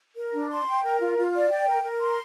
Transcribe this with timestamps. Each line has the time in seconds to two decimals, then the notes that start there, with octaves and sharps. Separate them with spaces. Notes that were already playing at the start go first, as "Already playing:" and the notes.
0.16 A#4
0.33 D4
0.50 C6
0.67 G5
0.84 A#4
1.00 F4
1.17 F4
1.34 D5
1.51 G5
1.67 A#4
1.83 A#4
2.00 C6